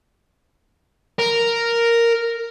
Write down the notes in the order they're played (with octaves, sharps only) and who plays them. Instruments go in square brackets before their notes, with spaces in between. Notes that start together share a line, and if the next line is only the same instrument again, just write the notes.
[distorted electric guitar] A#4